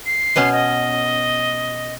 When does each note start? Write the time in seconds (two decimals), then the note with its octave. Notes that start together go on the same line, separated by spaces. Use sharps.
0.06 C7
0.36 B2 B3 C#4
0.53 D#5